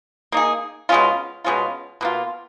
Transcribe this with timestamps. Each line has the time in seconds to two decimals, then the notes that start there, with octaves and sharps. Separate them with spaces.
0.32 A#3 D#4 G#4
0.89 B2 G#3 C#4 F4
1.44 B2 G#3 C#4 F4
2.01 B2 A#3 F4